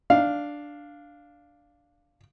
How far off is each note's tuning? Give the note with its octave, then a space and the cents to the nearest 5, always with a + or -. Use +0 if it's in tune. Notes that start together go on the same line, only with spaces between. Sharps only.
D4 +0 F5 +0